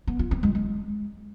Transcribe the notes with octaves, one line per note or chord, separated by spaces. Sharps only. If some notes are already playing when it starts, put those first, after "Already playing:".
B3
F4
C4
G#3
G#3